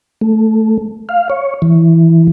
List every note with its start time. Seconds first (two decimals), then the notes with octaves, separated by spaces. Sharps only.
0.21 A3
1.09 F5
1.30 C#5
1.62 E3